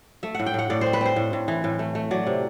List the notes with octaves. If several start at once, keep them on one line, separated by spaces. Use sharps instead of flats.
A3 E5
A2 F#5
G5
A2 F#5
A2 D5
C5
C4
B4
C4 C5
A2
A2
E3
A2
A3
A3
F#3 D5
C3